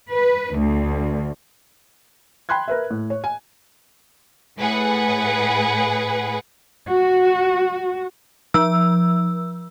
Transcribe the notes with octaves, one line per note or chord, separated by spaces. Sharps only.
B4
D2
G5 B5 C6 F#6 G#6
A#4 B4 E5
A2
C#5
G#5
A2 G#4 B4 F#5
F#4
F3 E6